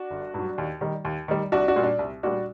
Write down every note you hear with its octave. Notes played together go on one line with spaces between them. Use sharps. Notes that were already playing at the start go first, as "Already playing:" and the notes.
Already playing: D4 F#4
G1
G2 F#3
D#2
D#3 G3
D#2
D#3 G3
C2 D4 F#4
D4 F#4
A#2 G3
D4
C2
A#2 G3 D4 F#4